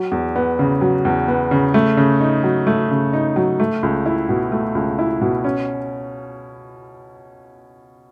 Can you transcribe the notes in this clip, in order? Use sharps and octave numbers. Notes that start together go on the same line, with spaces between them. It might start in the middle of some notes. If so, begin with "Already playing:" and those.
Already playing: F#3
E2
B3
C#3
F#3
E2
B3
C#3
A3
C#3
D#4
F#3
A3
C#3
D#4
F#3
A3
C#2
E4
B2
A3
C#2
E4
B2
C#4